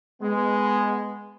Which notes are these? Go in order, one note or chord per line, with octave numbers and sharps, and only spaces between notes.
G#3 B3